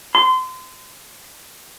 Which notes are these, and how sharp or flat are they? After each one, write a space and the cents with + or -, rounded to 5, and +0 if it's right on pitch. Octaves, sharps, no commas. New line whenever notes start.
C6 -30